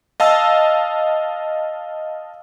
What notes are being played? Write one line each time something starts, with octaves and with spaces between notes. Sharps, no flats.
D#5 F5 A5 E6